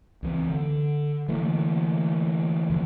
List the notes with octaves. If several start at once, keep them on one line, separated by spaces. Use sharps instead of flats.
C#2 E3 C4
D3
D3 E3 A3 A#3
E2 D3 F3